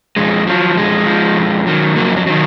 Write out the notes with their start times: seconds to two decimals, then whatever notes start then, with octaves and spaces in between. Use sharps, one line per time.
0.16 F2 G#3
0.47 F3 F#3
0.77 F2 G#3
1.07 F3
1.37 F2
1.67 D#3 F#3
1.96 F2 F#3 A#3
2.17 F#3
2.27 D#3 F#3